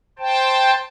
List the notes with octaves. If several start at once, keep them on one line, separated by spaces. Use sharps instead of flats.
C5 G5 A5